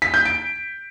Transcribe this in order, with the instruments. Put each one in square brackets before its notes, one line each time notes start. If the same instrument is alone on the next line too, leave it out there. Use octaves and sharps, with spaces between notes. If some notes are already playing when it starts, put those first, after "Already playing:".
[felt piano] B6
G6
D7